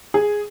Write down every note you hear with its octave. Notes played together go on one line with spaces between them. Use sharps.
G#4